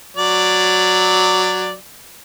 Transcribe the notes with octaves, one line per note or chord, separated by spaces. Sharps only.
F#3 D5